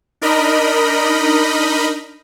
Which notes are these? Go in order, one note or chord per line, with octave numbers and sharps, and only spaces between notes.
D4 D#4 A#4 D#5 B5